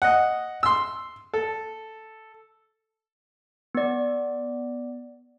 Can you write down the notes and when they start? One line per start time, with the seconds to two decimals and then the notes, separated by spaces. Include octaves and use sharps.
0.02 D#5 F#5
0.63 C6 E6
1.34 A4
3.75 B3 D5